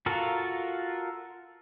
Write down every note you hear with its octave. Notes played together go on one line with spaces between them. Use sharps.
F4 F#4 A4 A#4 F5